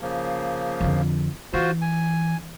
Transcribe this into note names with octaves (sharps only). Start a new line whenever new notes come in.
C#3 F3 A#3
F2 D3
E3 F4 F#4 C5
G#5